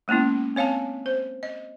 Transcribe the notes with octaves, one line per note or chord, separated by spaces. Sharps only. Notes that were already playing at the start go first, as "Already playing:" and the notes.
G#3 A#3 B3 C#4 E4
C4 C#5 F5 G#5 A5
C5
D#5